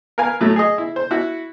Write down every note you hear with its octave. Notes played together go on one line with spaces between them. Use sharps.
A#4 B4 F5 G#5
A2 F#3 A3
G#4 D#5
E4
C5
E4 F#4